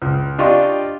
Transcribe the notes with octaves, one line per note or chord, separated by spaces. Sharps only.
C#2
D4 F4 G4 D#5 C#6